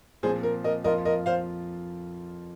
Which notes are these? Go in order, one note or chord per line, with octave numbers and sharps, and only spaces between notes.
A#2 F3 C4 G#4 C5
A#4
A#4 D#5
F2 F3 A#3 F4 A#4 D#5
A#4 D#5
C5 F5